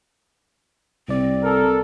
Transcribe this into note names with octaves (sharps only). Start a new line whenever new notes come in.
C2 C4 D5
A4 A#4